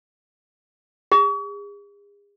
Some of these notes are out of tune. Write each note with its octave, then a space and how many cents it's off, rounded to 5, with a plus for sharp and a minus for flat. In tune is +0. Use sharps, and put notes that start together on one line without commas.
G#4 -40